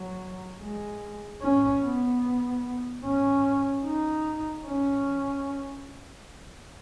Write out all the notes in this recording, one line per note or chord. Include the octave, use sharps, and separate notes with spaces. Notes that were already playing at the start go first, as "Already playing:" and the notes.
Already playing: F#3
G#3
C#4
B3
C#4
D#4
C#4